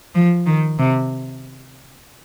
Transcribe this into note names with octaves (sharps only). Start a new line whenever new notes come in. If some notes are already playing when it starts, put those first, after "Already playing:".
F3
D#3
C3